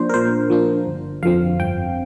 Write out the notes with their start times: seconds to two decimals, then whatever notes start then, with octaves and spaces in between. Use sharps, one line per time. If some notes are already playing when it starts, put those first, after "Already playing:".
Already playing: F3 A#3 D4 C5
0.09 A#4
0.14 A#2 C5
0.50 F3 A#3 D4
0.87 G1
1.23 F2 D3 F3 C4 F5
1.59 G1 G5